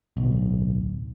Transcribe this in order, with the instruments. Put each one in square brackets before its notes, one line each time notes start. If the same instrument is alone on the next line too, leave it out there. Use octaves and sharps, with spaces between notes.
[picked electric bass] D1 B1